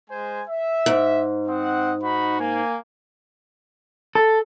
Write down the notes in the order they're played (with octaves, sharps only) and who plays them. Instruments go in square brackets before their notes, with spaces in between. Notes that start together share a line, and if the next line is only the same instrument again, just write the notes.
[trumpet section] G#3 C5 G#5
E5
[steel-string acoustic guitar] G#2
[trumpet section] C4 D#5 F#5
D#4 F#4 B5
A#3 G#5
[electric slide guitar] A4